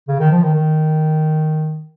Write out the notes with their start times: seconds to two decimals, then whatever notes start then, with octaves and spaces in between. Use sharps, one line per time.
0.08 C#3
0.19 D#3
0.31 F3
0.42 D#3
0.54 D#3